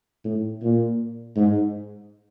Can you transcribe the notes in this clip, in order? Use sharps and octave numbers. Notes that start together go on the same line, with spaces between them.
A2
A#2
G#2